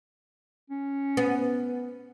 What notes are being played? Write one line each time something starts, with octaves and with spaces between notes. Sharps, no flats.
C#4
B3